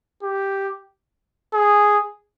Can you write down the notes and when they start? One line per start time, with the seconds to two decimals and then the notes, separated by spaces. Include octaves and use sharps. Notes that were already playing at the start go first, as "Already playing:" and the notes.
0.23 G4
1.54 G#4